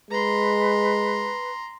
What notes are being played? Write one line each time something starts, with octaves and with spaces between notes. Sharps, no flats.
G#3 B4 A#5 C6